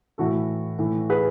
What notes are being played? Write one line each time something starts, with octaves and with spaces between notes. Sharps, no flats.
A2 E3 F#4 A4
A2 E3
G#4 B4